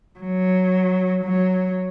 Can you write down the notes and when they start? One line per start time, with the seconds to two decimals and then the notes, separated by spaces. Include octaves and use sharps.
0.20 F#3
1.24 F#3